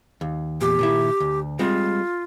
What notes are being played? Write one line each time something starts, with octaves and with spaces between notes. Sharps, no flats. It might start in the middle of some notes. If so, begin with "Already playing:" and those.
D#2
E2 A#2 G4
A#2 D#3 E4
D2
G3 G#3 C4 F4